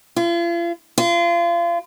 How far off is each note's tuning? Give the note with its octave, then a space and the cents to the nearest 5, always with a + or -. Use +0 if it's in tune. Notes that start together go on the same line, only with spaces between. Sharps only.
F4 -40
F4 -30